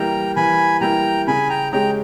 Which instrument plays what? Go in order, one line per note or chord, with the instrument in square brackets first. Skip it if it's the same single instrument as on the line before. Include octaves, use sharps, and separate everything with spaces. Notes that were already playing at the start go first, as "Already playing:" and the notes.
Already playing: [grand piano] E3 G3 A#3 E4 [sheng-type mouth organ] G5 A#5
[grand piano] E3 [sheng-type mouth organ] G#5 B5
[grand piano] G3 A#3 E4 [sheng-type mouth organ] G5 A#5
[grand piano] C#3 [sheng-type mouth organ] G#5 B5
[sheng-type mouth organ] G5 A#5
[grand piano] G#3 C#4 G4 [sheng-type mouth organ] G5 A#5